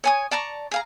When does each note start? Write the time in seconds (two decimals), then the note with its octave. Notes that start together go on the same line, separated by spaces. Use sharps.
0.04 C#5 G#5 D#6
0.31 D5 A5 A#5 C#6
0.71 G#4 F5 A#5